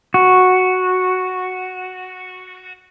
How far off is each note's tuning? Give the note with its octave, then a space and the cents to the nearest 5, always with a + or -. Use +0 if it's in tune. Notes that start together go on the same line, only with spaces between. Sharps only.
F#4 -5